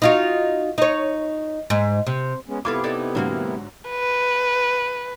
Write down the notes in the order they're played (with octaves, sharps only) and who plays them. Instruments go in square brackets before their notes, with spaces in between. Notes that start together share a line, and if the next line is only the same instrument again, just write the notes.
[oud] D#4 F4 F#4
D#4 C#5
G#2
C3
[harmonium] G#3 B3 C#4
[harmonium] C3 B3 E4 [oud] F4 A4 B4 [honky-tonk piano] D6 G#6
[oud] D#4 A4 D5
[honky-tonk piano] G#2 D3 F#3 [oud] E3 A#3 F#4
[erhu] B4